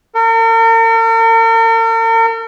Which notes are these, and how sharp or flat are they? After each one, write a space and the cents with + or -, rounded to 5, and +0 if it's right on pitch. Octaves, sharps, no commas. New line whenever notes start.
A#4 -45